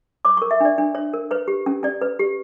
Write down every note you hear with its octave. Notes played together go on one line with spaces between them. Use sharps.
C#5 D6
C#6
A#4
E5
D4 D5
D4
C#5
A#4
B4 C#5
G4
C#4
C#4 D5
B4
G4